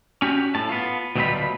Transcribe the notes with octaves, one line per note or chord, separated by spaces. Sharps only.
C#4 F#4 G4
A2 A5
B3 F4
D2 B2 F#3 G3 F4 B5